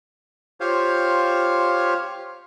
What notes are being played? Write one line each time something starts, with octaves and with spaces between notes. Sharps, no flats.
F4 G4 C5 C#5 F5